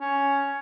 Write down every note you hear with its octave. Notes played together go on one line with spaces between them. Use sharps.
C#4